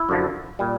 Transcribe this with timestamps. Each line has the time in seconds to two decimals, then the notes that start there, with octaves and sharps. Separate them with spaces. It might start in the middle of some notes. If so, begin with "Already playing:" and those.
Already playing: E4
0.09 F#2 D3 F3
0.59 A#2 G3